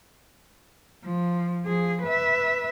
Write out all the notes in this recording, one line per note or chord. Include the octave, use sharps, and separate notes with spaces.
F3
F3 G#4
B4 E5